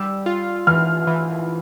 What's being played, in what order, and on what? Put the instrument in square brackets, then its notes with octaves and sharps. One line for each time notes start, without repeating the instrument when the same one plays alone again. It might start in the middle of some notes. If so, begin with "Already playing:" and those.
Already playing: [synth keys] G3 [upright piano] E6
[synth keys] F4
[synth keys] E3 [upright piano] F6
[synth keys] E3